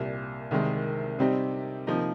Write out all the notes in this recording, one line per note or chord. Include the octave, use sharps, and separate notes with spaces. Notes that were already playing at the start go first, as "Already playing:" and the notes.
Already playing: C2 A#2 G3
C2 C3 D#3 G#3
C3 G3 C4 D#4
C3 F3 A#3 D#4